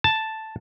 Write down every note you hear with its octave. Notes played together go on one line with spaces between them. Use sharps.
A5